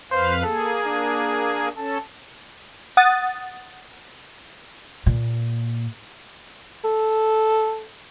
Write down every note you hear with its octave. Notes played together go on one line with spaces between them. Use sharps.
F2 B4 C5 F5
A#3 G#4 A4
D4
C#4 A4 A5
F#5 D#6 A6
A#2
A4